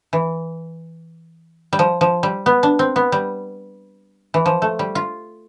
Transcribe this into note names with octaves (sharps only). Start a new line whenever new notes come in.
E3
G3
F3
F3
G3
B3
D4
C4
B3
G3
E3
F3
A3
G3
F4